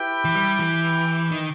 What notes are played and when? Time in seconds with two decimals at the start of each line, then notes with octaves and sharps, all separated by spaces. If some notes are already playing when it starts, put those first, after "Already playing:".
Already playing: E4 G4 B4 G5
0.25 E3
0.35 G3
0.59 E3
1.32 D#3